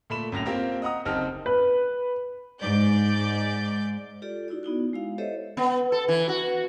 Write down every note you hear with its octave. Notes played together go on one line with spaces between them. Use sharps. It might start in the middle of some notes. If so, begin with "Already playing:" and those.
A#2 A3 B5 E7
F#2 A2 A#6 F7
A#3 C4 F4 G4 A#4
D#5 F#5 A#5 D#6
F#1 C4 D#4 G4 A5 F6
B4
G#2 D5 G6
F4 G4 A4 D5
D#4 E4 F#4 D5
B3 D#4 E4 F#4
G#3 E4 F5
G4 A4 C5 C#5 D#5 E5
B3
A4
E3
F#4